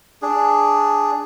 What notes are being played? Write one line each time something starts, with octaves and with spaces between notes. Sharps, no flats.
D4 G#4